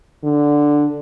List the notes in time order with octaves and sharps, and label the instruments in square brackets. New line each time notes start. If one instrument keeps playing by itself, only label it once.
[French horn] D3